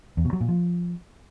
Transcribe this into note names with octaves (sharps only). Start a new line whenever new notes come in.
E2
B2
F#3
A#2
F3